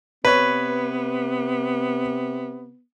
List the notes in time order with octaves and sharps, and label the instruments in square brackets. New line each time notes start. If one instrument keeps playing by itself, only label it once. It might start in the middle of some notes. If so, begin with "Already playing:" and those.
[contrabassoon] C3 [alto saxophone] B3 [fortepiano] B4 C#5